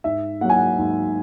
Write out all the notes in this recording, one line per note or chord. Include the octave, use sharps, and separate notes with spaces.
G#2 E5
F#3 A#3 F#5
G#5
F#5
G#2